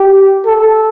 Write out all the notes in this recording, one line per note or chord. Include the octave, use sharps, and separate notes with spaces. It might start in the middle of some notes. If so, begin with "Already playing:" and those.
Already playing: G4
A4